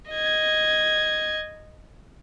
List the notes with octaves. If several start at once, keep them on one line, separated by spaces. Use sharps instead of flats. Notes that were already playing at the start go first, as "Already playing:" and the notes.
D#5 G#6